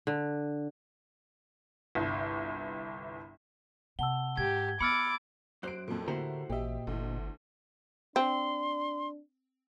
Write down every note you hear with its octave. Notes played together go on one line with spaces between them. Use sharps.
D3
G1 C2
C3 F#5 A5 E6 G7
G#2 G4 G#6
B3 B5 D6 E6 F6 A6 C#7
F#2 C5 F#6 D7
F2 A#2
A2 D3 E4 F#4 G4 A#4 C5
A1 A#2 G4 D#5 E5
G1 D2 E3
C4 D4 C6